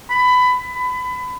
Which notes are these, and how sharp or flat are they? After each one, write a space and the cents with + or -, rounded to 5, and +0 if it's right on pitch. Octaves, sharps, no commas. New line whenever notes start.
B5 +20
B5 +30